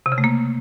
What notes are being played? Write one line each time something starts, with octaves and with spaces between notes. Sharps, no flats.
C3
C#3
A3
A#3